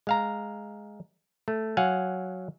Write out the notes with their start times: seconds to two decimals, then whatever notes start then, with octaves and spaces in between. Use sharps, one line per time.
0.07 G#3 F5 A#5
1.48 A3
1.77 F#3 F5 F#5 G#5